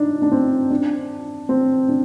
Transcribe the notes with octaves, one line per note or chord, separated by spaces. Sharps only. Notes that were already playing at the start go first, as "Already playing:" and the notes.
Already playing: D4 D#4
D4
C4
D4
C4
D4